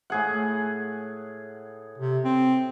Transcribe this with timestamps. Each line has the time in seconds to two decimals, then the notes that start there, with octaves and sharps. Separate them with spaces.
0.10 A2 G#4 F#5
1.98 C3
2.25 C4